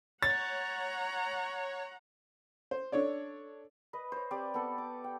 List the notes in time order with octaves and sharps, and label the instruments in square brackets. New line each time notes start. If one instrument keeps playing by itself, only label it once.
[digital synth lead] C#5 [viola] F#5 A#5 [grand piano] A6
[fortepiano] C5
D4 A4 C#5 D5
[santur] B4 D#5
C5 C#5
C4 G4 B4 D5
B3 A4
D6
G5